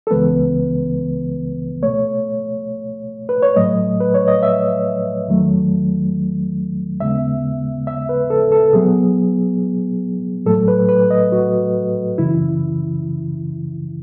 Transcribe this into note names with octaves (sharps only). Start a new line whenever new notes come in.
A4
C#2 C#3 E3 G#3 B3 B4
B2 A3 C#5
B4
C#5
A2 F#3 A3 D#5
B4
C#5
D#5
E5
E2 D#3 F#3 A3
D#2 C#3 G#3 B3 E5
E5
B4
A4
A4
B2 F#3 B3 G#4
A2 F#3 A3 A4
B4
B4
D#5
F#4
F#2 C#3 E3 E4